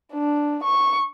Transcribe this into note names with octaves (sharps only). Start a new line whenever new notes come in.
D4
C#6